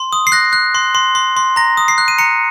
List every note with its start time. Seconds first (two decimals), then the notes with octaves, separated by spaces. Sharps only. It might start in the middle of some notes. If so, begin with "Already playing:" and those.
Already playing: C6
0.13 D#6
0.27 C7
0.32 F#6 A#6
0.53 F#6
0.75 C6
0.95 C6
1.15 C6
1.37 C6
1.56 A#5 A#6
1.77 D#6
1.88 C7
1.98 F#6
2.08 D#7
2.18 A#5 C#7